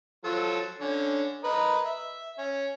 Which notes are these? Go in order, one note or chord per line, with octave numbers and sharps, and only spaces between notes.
F3 F#3 A4
D3 C#4
A#4 B4 D#5
E5
C#4